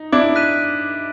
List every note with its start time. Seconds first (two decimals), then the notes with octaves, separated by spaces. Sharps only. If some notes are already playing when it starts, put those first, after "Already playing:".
Already playing: D#4
0.12 D4 E4 D6
0.35 F#6 B6 D#7